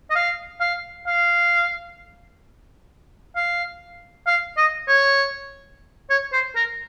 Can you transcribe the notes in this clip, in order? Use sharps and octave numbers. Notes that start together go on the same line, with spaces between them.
D#5
F5
F5
F5
F5
F5
D#5
C#5
C#5
C5
A#4